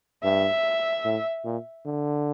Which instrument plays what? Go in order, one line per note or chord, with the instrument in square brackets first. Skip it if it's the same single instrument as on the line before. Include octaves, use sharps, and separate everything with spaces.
[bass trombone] G2 [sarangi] E5
[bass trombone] A2
A#2
D3